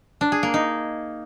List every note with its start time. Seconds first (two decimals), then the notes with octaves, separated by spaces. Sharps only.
0.21 D4
0.32 G#4
0.43 A#3
0.54 D#4